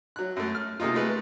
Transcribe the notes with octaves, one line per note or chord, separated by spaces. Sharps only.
F#3 F#6
F#2 A3
F6
C3 G#3 A#3 D#4 F4
G#3 A3 B4